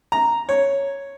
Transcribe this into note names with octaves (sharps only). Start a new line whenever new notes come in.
A#5
C#5